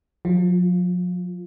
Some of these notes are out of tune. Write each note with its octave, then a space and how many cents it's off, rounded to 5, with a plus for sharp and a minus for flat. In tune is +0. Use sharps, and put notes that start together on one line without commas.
F3 +45 F4 +0